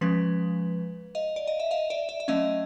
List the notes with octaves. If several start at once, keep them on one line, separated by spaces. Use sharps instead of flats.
F3 G#3 C#4 B4
D#5 F5
D5
D#5
E5
D#5 F5
D5 E5
D5 E5
E5
F#3 A3 C#4 D#5 F5